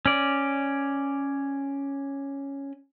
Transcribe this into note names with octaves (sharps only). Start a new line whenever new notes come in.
C#4 D5